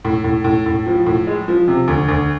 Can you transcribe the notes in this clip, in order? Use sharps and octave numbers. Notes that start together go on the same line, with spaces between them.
A2
A2
A2
A2
F3
A2
G#3
F3
C3
D2
D2